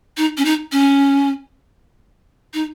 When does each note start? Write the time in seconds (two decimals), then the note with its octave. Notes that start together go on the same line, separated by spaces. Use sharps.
0.17 D#4
0.38 C#4
0.45 D#4
0.72 C#4
2.54 D#4